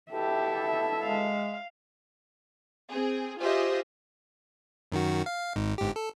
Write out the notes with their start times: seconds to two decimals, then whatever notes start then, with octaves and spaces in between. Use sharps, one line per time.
0.12 B2 E4 G4 A4 E5
1.03 G#3 F5
2.91 C4 G#4
3.39 F4 G4 G#4 C5 D#5 E5
4.92 F#2 D#3 F#4
5.26 F5
5.56 G#1 G#2
5.78 G1 G#2 G4
5.96 A4